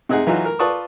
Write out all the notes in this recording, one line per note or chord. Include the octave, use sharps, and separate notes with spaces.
C3 D#4 G#4 F#5
E3 F#3 D#4 F4 F#4
A#4
F4 B4 D5 A5 C#6 D#6